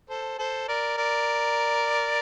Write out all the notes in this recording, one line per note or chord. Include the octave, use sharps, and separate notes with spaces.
A4 C5
A4 C5
A#4 D5
A#4 D5